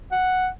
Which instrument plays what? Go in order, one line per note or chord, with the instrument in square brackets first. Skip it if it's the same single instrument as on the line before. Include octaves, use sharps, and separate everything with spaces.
[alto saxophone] F#5